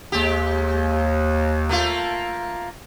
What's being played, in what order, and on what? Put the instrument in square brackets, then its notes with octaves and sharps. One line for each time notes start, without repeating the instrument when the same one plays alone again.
[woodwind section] D#2 [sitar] G#3 G4
[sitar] A3 A#3 F4